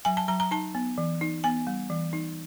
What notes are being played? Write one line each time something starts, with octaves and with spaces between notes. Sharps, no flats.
F#3 G#5
A5
F#3 A#5
A#5
D#4 A5
B3
E3
D#4
B3 G#5
G3
E3
D#4